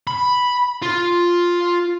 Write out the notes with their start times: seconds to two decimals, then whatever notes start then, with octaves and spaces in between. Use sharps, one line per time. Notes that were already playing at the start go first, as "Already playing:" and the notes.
0.07 B5
0.82 F4